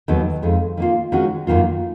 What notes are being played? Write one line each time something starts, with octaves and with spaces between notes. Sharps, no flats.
D#2 D#3 F#3 B3
F2 D#3 G#3
D#3 A#3 F4
D#3 G#3 C#4 F#4
F#2 D#3 A#3 F4